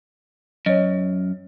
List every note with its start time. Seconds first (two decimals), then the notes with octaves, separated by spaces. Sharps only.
0.66 F#2 C#5 D#5